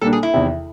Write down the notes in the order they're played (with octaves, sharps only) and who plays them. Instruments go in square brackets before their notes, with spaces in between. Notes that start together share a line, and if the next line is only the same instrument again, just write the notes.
[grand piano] A#2 G3 A#3 D4 [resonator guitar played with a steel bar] A4
[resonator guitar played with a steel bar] G#4
E4
[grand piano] E2 C3 D#3